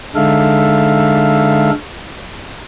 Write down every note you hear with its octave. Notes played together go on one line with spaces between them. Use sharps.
D3 G#3 D#4 A4 E5 F5